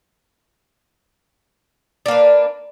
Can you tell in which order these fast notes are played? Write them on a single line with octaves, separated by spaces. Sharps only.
D4 A#3 B4